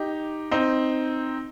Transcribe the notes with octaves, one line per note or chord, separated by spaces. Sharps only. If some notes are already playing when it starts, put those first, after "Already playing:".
Already playing: D#4 G4
C4 D#4